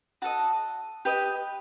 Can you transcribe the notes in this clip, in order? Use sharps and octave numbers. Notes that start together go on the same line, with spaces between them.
F#4 A4 D#5 A5
G4 B4 D#5